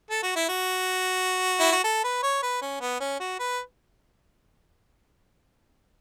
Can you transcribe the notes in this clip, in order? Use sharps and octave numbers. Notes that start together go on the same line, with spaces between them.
A4
F#4
E4
F#4
E4
F#4
A4
B4
C#5
B4
C#4
B3
C#4
F#4
B4